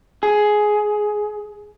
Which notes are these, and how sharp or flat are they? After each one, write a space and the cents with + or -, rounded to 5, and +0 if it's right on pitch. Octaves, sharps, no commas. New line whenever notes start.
G#4 +10